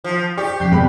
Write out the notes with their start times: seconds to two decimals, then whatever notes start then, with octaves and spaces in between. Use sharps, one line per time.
0.04 F3
0.38 G4 D5 C#6
0.60 F2 C#3 G6 B6 C7
0.72 G1 B2 G#3 C4 B5